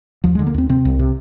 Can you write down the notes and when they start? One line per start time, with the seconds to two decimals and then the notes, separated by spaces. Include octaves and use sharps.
0.24 D#2 F3
0.35 D3 G#3
0.47 A#3
0.54 D#2 C4
0.69 C3 C4
0.85 C2
0.99 C3